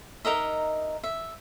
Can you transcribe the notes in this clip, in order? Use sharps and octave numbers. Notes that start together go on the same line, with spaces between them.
D#4 A#4 D#5 E5
E5